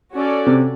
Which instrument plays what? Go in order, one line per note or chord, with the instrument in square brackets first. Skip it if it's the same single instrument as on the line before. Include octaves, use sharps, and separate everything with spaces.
[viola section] C#4 F#4 A4 D5
[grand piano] C3